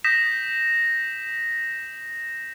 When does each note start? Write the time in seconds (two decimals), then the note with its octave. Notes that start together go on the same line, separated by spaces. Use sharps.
0.04 D#6 G6 A#6 B6 E7